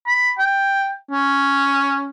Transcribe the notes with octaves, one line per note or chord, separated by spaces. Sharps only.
B5
G5
C#4